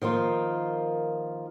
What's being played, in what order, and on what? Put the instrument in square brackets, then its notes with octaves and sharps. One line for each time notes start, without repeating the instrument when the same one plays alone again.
[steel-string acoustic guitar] D#3 F3 A#3 F4